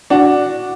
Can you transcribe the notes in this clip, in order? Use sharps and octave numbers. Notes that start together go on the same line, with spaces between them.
D4 F#4